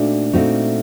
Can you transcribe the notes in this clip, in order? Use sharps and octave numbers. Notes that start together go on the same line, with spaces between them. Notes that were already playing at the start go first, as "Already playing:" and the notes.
Already playing: A#2 A3 C4 D4 D#4 F#4
A#2 A3 C4 D#4 F#4